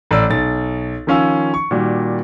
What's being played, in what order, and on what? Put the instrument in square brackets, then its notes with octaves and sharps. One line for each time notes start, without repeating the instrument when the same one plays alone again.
[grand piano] A1 D5 E6
B1 A6
D#3 F3 C#4 F5 G#5 E6
C#6
A#2 D#3 G3 F#4